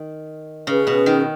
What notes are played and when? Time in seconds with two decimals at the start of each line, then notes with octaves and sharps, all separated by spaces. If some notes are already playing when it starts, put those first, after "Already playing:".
Already playing: D#3
0.67 C#3 C#4 G#4 B4
0.87 B2
1.06 D#3